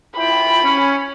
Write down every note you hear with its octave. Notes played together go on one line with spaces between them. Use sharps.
E4 F4 G5 B5
C#4